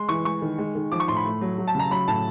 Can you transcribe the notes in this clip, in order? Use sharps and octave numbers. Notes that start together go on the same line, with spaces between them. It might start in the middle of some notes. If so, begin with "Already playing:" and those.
Already playing: G#3 C6
E3 C#6
G#3 C#6
D#3
G#3
D#3
F3 D6
C#6
A2 C6
B5
A3
F#3
F#3
A5
C#3 A#5
F#3 B5
A2 A5